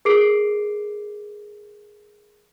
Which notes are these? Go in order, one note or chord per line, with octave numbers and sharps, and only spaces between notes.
G#4 A#4 D6 C7 D7